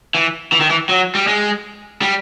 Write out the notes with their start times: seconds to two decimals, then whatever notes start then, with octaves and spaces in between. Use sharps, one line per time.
0.15 E3
0.52 E3
0.60 D#3
0.70 E3
0.89 F#3
1.15 G3
1.27 G#3
2.01 G3